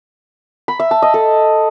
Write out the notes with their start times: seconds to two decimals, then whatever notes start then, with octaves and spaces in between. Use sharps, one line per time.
0.68 B5
0.80 E5
0.91 A5
1.02 D#5
1.14 A4